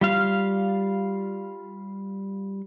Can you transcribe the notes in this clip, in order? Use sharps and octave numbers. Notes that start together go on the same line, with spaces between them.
G3 F4 F5